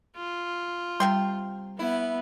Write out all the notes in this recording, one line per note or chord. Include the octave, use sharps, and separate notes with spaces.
F4
C3 G3 G5 C6
B3 E4